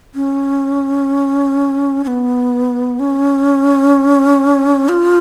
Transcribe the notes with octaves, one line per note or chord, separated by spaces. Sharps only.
C#4
C#4
B3
C#4
F4